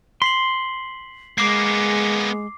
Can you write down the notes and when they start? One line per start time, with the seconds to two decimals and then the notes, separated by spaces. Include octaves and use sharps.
0.22 C6 B6 C7 F#7
1.38 G#3 A#3 B3 D6 C7